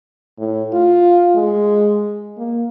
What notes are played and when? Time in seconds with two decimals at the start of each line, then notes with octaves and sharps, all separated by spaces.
0.38 A2
0.73 F4
1.36 G#3
2.38 A#3